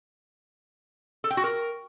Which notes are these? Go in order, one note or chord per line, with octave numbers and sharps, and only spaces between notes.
A4
G5
F#4
A#4